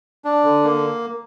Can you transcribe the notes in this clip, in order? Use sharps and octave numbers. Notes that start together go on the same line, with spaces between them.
D4
D3
A#3